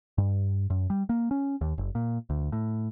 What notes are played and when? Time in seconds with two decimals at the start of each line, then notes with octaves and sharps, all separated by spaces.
0.18 G2
0.70 F#2
0.90 G3
1.09 A#3
1.31 C#4
1.61 D#2
1.78 F#1
1.95 A#2
2.30 D2
2.52 A2